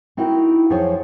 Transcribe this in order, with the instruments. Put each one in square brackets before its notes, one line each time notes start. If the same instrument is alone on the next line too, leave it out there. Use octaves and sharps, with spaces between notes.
[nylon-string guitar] C4 D#4 E4 F#4 A#4
F2 F3 F#3 G#4 C5 C#5